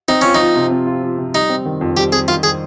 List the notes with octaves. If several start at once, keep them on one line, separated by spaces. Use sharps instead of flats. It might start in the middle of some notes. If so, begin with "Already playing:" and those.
C4 D#4
C#4 F4
D#4
F3
C3
C4
F4
F3
C3
G3 D#4
C4
D#3
F2
G3 G4
C4 G#4
D#3 F4
G#4